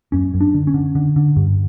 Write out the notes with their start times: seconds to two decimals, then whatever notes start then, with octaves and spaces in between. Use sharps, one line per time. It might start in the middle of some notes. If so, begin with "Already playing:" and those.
0.12 F#2 C#4
0.34 F#2
0.41 D4
0.54 D3
0.67 C#4
0.74 D3
0.95 D3
1.16 D3
1.36 G2